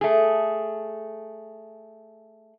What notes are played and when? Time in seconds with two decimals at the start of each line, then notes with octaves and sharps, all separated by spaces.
0.01 A3 G#4